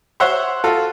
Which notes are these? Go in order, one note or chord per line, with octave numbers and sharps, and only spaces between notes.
C5 C#5 E5 F#5 C6
F4 F#4 A4